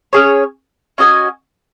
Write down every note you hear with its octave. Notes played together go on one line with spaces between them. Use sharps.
C#4 G#4 C#5
C#4 F#4 D#5 G#5